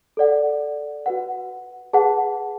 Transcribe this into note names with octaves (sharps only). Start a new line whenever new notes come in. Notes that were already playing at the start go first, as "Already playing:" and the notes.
A4 D5 F#5
F#4 B4 F#5
G#4 B4 F#5 A5